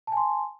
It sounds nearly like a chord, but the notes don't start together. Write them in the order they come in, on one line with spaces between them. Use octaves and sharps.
A5 G#5 C6